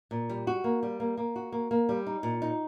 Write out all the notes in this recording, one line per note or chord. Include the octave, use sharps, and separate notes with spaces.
A#2
G3
F#4
A#3
G3
A#3
A#3
F#4
A#3
A#3
G3
D#4
A#2
D#4